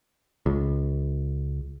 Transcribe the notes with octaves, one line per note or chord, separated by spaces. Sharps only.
C#2